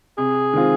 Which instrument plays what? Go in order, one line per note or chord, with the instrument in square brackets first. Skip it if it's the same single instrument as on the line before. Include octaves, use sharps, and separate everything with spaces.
[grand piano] C3 [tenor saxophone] G#4
[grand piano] D#3 G#3 C4 F4